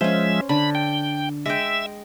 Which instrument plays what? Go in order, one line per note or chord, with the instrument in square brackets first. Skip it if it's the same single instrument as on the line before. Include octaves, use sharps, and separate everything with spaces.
[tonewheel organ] F3 G#3 E5 [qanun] C#4 C5
[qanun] D3 [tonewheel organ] B5
[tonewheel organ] G5
[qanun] G#3 G5 [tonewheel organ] E5